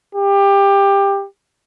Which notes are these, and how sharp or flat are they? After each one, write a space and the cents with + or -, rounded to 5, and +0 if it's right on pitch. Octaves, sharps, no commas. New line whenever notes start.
G4 +20